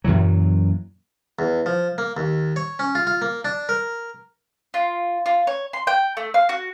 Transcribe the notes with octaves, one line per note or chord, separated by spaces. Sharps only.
F#2 A#2 E3 F#3
E2
F3
A#3
D#2
C#5
C#4
F4
F4
A#3
D4
A#4
F4
F4
C#5
C6
G5
A3
F5
F#4